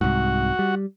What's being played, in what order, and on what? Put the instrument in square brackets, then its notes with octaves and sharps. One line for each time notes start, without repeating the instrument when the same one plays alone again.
[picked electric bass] C2 G#2 [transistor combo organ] F#4
[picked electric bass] G3